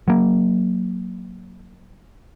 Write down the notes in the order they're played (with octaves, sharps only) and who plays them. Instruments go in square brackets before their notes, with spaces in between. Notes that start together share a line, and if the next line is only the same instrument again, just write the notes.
[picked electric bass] F#3 A#3